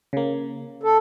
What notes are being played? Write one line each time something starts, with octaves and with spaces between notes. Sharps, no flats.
C#3 A#3
A4